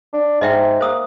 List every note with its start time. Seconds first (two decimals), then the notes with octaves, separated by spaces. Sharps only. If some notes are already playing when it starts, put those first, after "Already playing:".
0.13 D4
0.41 G#2 D#5 E5 G5
0.81 A#3 C5 D#6 E6